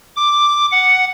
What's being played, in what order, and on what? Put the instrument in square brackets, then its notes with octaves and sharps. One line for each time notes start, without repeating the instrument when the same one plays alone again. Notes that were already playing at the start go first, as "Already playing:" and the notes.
[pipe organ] D6
F#5